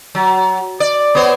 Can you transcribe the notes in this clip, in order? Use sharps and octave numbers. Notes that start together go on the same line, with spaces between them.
F#3
D5
B3 C5 C#5